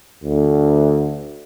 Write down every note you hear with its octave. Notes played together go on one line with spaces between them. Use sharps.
D2